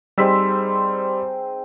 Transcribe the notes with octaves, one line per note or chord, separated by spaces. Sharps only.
G3 C4 D#4 G#4 E6 B6